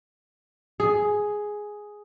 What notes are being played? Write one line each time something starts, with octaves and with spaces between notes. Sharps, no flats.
G#4